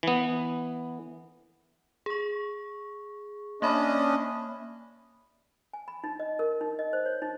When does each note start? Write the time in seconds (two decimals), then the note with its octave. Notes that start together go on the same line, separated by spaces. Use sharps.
0.03 E3 B3
2.06 G#4 C#6
3.62 A#3 C#4 D4 D#5 E5 B5
5.73 G#5
5.88 B5
6.04 D#4
6.19 D#5
6.39 A#4
6.61 D#4
6.79 D#5
6.93 C5
7.06 C#5
7.22 D#4